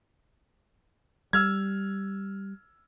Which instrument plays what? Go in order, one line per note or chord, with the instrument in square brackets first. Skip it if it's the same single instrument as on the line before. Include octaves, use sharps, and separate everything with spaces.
[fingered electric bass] G3 [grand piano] E6 F6 G#6